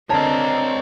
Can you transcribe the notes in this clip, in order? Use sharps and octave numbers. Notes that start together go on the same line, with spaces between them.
D3 C4 D4 A#4 C#5 D#5 A5